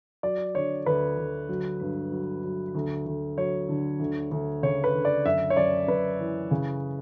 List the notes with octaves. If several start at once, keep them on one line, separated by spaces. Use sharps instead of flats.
F#3 D5
D3 C#5
D2 B4
D2
F#3
G2
F#3
F#3
D2
D2
F#3 C#5
D3
D2
D2
C#3 C#5
B4
D2
D5
F#2 E5
C#5
F#2 D5
F#2 B4
E3
C#3